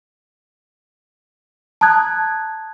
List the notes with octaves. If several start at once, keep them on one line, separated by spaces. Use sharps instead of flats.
A5 A#5 D#6 F#6 G#6